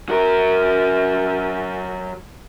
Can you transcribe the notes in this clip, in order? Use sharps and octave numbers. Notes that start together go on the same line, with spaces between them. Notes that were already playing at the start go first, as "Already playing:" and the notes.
F#3 A#4